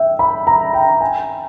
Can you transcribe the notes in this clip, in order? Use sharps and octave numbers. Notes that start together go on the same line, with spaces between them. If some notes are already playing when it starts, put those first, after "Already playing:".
Already playing: E5 G5
B5
A#5
G5
G#5